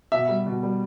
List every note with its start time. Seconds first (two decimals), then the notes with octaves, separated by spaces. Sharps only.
0.12 B2 E5
0.29 G3
0.46 B2
0.63 G3